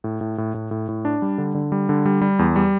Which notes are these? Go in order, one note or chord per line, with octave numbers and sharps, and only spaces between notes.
A2
A2
A2
A2
A2
A2
D4
G3
D3
D3
G3
D3
G3
G3
E2
G3